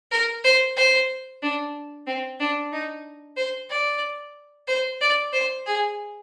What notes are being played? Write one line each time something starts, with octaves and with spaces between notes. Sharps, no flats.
A#4
C5
C5
D4
C4
D4
D#4
C5
D5
C5
D5
C5
G#4